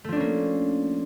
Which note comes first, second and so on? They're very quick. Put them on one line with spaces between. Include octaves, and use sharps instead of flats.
A3 F3 D4 C#4 A#3